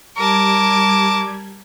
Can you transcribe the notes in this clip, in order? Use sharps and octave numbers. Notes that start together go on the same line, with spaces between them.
G3 A#4 A5 D6 G#6